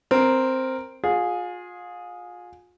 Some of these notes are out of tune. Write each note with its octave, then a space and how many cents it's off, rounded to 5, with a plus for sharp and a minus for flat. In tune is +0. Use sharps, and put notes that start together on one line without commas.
C4 +0 A#4 +0
F4 +35 G#4 +0